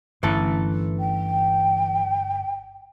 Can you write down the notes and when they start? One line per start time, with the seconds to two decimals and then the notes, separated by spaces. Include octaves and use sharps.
0.23 G1 D3 E3 A3 C#4 A4
1.00 G5